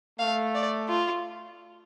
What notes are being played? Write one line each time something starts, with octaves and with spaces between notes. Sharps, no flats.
A3 F5
D5
F4